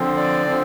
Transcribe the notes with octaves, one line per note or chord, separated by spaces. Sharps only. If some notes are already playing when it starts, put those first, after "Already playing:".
Already playing: D3 F3 C4
D5
D3 F3 C4